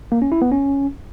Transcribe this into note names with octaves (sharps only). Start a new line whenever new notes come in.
A#3
C#4
E4
B3
C#4